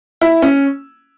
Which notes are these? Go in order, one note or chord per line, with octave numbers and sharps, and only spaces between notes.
E4
C#4